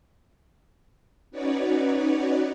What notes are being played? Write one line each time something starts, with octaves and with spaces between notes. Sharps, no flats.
C#4 D#4 F#4 B4 C#5 D5